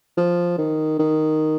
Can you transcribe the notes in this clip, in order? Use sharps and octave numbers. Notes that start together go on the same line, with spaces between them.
F3
D#3
D#3